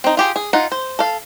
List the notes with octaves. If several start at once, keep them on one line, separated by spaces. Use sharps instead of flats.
C4 D#4
F4 G4 G#4
G#4
D#4 F4 F#5
C5
A4 F5